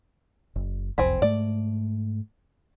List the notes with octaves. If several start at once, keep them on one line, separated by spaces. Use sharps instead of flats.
F#1
F#1 C2 F2 C4 G#5 B5
G#2 A3 D5